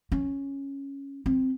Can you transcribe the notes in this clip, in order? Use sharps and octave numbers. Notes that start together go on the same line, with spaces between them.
C#4
C4